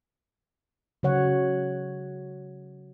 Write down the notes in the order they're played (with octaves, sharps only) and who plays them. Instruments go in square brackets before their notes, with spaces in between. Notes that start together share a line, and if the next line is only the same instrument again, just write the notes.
[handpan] C#3 F#3 C#5 F#5